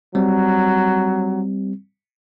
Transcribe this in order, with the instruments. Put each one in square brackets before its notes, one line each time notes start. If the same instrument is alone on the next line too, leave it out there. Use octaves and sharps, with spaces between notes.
[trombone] F#3 [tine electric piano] G3 C4